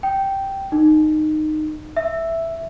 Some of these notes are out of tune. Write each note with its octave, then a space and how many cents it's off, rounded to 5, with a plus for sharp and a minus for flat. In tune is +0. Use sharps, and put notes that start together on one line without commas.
G5 -5
D#4 -15
E5 +5